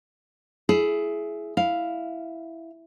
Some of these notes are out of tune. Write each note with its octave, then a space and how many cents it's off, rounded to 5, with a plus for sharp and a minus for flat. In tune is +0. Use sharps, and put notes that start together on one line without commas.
E4 +15 G#4 +20
E4 +0 F5 +0